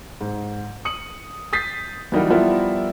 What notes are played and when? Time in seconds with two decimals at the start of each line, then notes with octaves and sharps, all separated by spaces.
0.21 G#2
0.85 D#6 C#7 F#7
1.53 D#6 G6 A6 B6 C7
2.12 E3 F#3 G3 D#4 F#4 A#4
2.30 F3 G3 B3 E4 F4 A#4